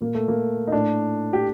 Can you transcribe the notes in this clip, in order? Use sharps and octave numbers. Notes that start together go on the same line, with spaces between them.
A#2 A#3
A3
A#3
D#4
A2 D4
G4